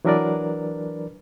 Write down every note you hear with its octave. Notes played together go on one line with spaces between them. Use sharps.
E3 F#3 D4 A#4 B4 D5